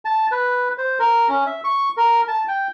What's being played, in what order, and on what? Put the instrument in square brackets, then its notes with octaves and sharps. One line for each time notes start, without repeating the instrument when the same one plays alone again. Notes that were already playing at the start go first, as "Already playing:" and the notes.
[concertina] A5
B4
C5
A#4
C#4
E5
C#6
A#4
A5
G5